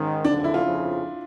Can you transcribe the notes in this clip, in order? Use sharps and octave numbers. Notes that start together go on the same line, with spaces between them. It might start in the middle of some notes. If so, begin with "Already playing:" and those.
Already playing: G#2 D#3 C#4
F#1 F2 D3 D4
E4
F4
F2 C#3 F3